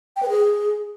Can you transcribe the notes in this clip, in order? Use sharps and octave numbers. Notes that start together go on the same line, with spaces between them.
G5
B4
G#4